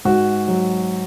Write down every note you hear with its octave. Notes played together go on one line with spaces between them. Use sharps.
G#2 F#4
F#3